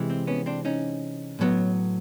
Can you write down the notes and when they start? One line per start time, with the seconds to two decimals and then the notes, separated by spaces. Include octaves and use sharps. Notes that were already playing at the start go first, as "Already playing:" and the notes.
Already playing: C3 E3 G#3
0.10 C4
0.27 B3 C#4
0.46 C4 D4
0.65 C#4 D#4
1.39 A2 F#3 B3